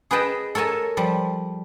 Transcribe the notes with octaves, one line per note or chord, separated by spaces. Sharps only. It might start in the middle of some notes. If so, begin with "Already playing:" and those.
G#4 B4 D#5 G5 A5
A4 A#4 C#5 G#5 A5
F3 G3